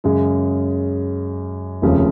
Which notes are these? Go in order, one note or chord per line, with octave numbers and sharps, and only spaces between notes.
F#2 C#3 G#3
F1 D#2 C#3 F3